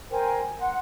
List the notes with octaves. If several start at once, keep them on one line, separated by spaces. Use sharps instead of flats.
A#4 C5 G5 G#5
F#5 C6